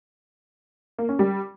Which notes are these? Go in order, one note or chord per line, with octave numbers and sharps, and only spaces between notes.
A#3
C#4
G3